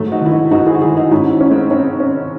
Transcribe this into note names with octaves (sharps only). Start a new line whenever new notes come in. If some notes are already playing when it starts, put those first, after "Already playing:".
Already playing: G#2 F#3 A3
D#4 F#4
D#3 E4
D#4 F#4
G#2 D#4 F#4
E4 G#4
F#4
D#3 E4 G#4
D#4 F#4
G#2 C#4 E4
C#4
G#3 C4
C4 C#4 D#4
C#4